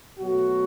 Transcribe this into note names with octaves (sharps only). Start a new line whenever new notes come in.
B2 F#3 A3 F#4